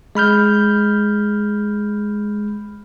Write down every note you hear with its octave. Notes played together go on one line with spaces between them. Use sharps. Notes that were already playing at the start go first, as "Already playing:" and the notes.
G#3 B5 F6 G6